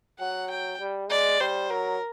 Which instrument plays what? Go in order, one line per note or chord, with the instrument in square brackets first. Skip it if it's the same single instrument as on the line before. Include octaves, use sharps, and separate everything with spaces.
[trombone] F#3 [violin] F#5
[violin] G5
[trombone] G3
[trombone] G#3 [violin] D5
[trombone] G3 [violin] C5
[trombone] F#3 [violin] A#4